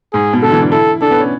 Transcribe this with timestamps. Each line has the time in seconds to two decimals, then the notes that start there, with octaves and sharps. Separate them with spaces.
0.13 G#2 G#4
0.33 B2
0.43 D3 A4
0.52 E3
0.62 D4
0.72 E4 A4
1.01 D4 A4
1.11 B3
1.20 C#4